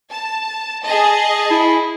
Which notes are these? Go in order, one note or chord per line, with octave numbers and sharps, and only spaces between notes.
A5
G#4 D#5 A5
E4